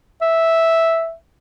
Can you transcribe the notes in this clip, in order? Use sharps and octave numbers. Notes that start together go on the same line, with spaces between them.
E5